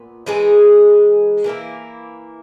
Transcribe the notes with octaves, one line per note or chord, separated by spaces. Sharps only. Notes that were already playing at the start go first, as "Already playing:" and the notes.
Already playing: A#2 B3
E3 G#3 D#4 G#4
E3 A#3 E4 A#4